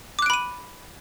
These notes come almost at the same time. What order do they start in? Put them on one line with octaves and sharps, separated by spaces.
D6 F#6 D7 B5 D#7